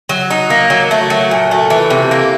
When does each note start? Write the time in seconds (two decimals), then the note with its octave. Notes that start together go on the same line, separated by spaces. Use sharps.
0.09 F#3
0.31 D#4
0.50 A#3
0.70 F#3
0.91 A3
1.10 F#3
1.31 A#2
1.51 A3
1.70 E3
1.90 C3
2.11 A#3